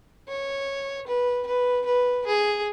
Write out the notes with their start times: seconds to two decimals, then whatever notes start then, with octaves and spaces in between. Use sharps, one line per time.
0.28 C#5
1.07 B4
1.46 B4
1.86 B4
2.26 G#4